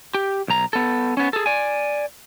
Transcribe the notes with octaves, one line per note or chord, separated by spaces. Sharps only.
G4
B1 A#5
B3 A4
B3 C#4
G#4 A4
D5 G#5